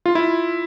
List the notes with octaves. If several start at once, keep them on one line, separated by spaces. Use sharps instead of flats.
F4
E4